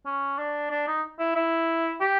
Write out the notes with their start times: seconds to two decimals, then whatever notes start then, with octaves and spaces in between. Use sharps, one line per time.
0.06 C#4
0.38 D4
0.71 D4
0.88 D#4
1.19 E4
1.36 E4
2.01 G4